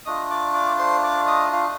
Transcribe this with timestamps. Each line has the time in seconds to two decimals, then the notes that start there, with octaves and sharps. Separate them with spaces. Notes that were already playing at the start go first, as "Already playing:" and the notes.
0.05 A3 D4 F4 D#5 D#6
0.30 D5 D6
0.54 D5 D6
0.79 C5 C6
1.03 D5 D6
1.28 D#5 D#6
1.53 F4 F5